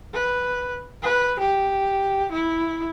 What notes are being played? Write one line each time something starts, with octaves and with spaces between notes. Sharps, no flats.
B4
B4
G4
E4